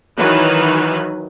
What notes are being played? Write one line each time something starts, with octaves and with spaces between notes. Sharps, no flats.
D#3 E3 F#3 B4